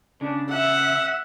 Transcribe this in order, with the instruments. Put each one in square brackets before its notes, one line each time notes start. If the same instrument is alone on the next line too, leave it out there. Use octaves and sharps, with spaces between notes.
[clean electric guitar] C#3 [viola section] D4
[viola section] E5 [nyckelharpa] F#5